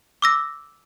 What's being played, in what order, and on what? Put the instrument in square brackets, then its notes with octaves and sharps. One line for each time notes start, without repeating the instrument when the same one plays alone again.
[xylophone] D6 E6 A#6